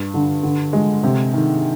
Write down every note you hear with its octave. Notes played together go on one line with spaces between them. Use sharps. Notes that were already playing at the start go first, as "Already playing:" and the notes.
Already playing: G2
D3
D3
G#3
C3
D#3